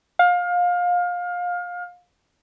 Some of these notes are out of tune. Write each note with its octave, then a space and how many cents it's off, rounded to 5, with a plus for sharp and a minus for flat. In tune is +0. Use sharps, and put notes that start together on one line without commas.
F5 +25